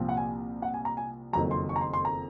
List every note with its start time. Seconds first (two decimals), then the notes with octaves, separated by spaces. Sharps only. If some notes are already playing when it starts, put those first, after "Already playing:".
Already playing: C2 A#2 F3 C4
0.09 F#5
0.17 G#5
0.62 F#5
0.74 G#5
0.85 A#5
0.97 G#5
1.33 F#1 F2 D#3 F#3 A#5
1.51 C6
1.69 C#6
1.76 A#5
1.81 C6
1.93 C6
2.05 A#5